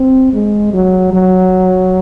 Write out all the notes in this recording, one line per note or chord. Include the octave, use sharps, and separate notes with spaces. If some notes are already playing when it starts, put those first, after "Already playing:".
Already playing: C4
G#3
F#3
F#3